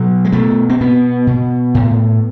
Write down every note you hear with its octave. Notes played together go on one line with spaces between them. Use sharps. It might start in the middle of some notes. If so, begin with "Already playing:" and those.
Already playing: B2 F#3
G#3
B2 A3
C4
B2 B3
B2
A2